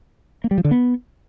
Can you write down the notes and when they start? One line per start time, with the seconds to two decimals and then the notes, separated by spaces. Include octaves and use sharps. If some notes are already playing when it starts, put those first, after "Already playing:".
0.44 A#3
0.51 G3
0.58 F3
0.65 D3
0.71 B3